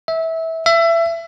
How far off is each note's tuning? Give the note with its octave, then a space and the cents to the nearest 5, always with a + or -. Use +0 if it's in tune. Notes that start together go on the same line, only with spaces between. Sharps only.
E5 -20
E5 +25